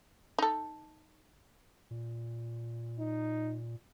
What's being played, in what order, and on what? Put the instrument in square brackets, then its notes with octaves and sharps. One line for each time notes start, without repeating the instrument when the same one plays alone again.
[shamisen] D#4 A4
[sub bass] A#2
[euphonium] D#4